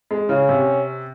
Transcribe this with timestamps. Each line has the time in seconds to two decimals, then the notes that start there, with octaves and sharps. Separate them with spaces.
0.11 G#3
0.29 C#3 C#4
0.49 C3